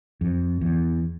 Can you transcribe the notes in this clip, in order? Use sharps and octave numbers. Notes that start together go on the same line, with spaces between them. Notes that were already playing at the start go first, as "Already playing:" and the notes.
F2
E2